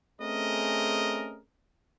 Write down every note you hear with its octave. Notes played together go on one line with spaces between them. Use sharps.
A3 C4 C#4 G#4 A#4 D#5